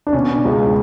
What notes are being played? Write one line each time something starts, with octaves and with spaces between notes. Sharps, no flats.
D4
B2 C#4
C#2